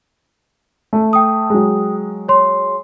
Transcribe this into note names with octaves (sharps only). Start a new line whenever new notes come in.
A3
G5 D#6
F#3 G#3
C#5 C6